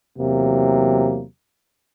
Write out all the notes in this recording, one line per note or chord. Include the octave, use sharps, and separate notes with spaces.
E2 C3 F#3 A#3